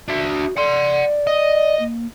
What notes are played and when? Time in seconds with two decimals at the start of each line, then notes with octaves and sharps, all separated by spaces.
0.08 D4 F#4 E5
0.57 D5 F#5 C6
1.27 D#5
1.79 A#3